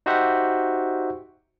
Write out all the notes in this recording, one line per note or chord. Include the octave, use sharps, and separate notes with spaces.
D#4 F#4 G4 C5 E5 F#5